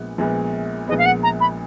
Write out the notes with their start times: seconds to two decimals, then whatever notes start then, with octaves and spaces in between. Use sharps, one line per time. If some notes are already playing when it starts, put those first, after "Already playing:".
Already playing: A#1 A#2 G#3 B3
0.18 A#1 A#2 G#3 B3
0.88 A#1 A#2 G#3 B3 D#5
0.98 F5
1.05 F#5
1.23 A#5
1.40 B5